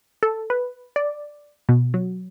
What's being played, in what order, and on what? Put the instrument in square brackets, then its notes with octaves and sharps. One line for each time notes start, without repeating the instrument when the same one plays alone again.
[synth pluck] A4
B4
D5
B2
F#3